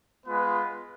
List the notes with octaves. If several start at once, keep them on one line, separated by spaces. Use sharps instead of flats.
G#3 B3 F4 B4